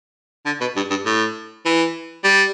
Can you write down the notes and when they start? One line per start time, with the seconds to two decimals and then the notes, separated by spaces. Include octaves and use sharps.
0.46 D3
0.61 B2
0.76 G2
0.90 G2
1.06 A2
1.65 E3
2.24 G3